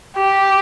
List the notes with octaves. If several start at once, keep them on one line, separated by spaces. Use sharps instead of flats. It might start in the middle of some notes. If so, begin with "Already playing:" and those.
G4